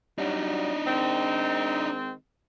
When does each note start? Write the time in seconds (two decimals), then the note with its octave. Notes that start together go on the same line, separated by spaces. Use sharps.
0.18 F#3 G3 D4 D#4
0.87 D#3 G#3 C4